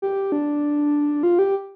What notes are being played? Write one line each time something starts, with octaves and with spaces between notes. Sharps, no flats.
G4
D4
F4
G4